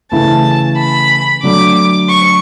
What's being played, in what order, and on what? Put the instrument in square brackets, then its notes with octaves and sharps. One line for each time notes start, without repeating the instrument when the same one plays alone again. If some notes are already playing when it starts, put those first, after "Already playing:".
[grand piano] C#3 E3 A3 E4 [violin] A5
[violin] B5
[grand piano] D3 F#3 A3 D4 [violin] D6
[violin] C#6